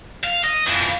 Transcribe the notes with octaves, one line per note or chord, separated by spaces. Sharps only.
F5
D#5
F2 E3